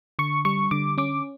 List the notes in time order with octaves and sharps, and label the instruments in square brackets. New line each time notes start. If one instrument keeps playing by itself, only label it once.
[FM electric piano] D3 C#6
G3 C#6
D3 D6
C#4 D6